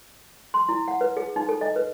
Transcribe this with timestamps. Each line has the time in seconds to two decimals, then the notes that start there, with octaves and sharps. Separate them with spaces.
0.54 C6
0.69 E4
0.88 F#5
1.01 B4
1.17 G#4
1.36 D#4
1.49 A4
1.61 D#5
1.76 B4